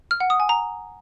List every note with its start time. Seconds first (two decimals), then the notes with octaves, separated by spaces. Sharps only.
0.11 F6
0.20 F#5
0.30 D#6
0.40 G#5
0.49 A#5